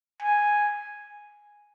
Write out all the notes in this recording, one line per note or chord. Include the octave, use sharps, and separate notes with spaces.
G#5